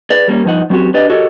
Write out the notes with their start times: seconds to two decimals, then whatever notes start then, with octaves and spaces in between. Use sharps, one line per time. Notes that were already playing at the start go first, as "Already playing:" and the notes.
0.10 G#4 B4 D5
0.28 G3 A#3 C#4
0.44 G2 F3 D#4 F#5
0.70 F#3 C4 C#4 F#4 G4
0.94 D4 G4 B4 D5 D#5
1.10 F#4 G4 A4 A#4 C#5 D#5